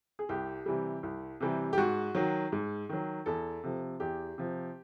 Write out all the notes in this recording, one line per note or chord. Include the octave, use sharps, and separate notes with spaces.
G#4
C2 G4
C3 E3 G3
C2
C3 E3 G3
G4
G#2 F#4
D#3 F#3
G#2
D#3 F#3
E2 A4
C3 F3
E2 G4
C3 F3